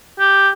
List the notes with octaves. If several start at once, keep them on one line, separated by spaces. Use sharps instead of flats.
G4